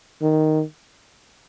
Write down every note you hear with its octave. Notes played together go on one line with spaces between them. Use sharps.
D#3